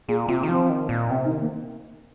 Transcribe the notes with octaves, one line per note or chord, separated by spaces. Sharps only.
A#2 G#4
C3 F4
D#3
F3 C4
D#3
A#2
C3 C4
D#4
D#3
A#3